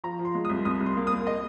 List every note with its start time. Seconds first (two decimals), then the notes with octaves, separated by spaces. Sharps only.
0.04 F3 A#5
0.19 F3
0.25 C6
0.35 G#3
0.45 C2 D#6
0.65 C2 D#6
0.81 C2
0.86 C6
0.97 A#3
1.07 D#6
1.12 A#3
1.27 D#5